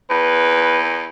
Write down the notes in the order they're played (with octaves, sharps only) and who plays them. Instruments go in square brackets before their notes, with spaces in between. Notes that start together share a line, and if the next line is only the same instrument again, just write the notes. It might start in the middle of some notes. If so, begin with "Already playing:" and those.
[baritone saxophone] E2 [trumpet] B4